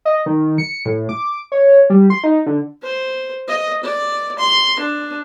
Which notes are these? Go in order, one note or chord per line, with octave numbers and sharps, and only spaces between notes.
D#5
D#3
C#7
A2
D6
C#5
G3
C6
D#4
D3
C5
D#5
D5
C6
D4